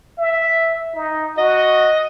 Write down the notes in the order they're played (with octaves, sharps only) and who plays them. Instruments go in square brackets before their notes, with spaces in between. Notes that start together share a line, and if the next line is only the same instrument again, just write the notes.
[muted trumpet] E5
D#4
[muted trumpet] F#4 [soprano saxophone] D#5